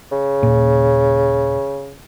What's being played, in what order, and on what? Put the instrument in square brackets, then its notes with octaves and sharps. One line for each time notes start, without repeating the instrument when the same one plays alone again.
[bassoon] C#3
[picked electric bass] D#1 A#2